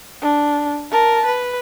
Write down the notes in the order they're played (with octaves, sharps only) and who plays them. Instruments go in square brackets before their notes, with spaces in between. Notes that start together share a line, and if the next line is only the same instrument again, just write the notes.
[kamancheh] D4
A#4 A5
B4